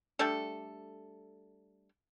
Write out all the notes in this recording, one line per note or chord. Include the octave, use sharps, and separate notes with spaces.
G3 A3 D4 A4